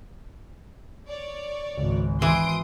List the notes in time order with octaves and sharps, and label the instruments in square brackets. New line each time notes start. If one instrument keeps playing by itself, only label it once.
[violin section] C#5 D5
[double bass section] G#1 [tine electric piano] C#2
[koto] E3 [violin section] C6 D#6 D7